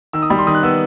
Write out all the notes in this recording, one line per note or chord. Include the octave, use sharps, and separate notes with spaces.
D#3 E6
D#6
G3 B5
C6
D#3 D#6
F#6
B3 E6